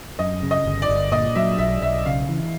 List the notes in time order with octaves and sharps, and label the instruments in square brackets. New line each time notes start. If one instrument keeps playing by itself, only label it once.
[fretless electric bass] F#2 [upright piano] D#5
[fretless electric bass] C#3
[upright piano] D#5
[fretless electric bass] G1
[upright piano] D5
[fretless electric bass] G1
[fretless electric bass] A#2 [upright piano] D#5
[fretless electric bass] F#3 [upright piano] E5
[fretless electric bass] B1 [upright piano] E5
[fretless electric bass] B1 [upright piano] E5
[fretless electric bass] C#3 [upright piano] F5
[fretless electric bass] E3